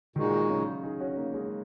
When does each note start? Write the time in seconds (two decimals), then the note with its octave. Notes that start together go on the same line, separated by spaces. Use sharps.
0.16 A#2 D#3 G#3 D#4 F#4
0.49 C#3 F#3
0.83 D#4 G#4
1.00 C#4 F#4
1.17 A#3 D#4
1.34 G#3 C#4